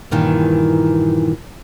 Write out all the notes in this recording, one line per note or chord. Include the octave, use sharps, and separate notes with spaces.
G2 A#2 D#3 E3